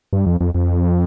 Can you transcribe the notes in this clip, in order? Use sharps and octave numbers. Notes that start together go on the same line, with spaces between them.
G2
F2
F2
F2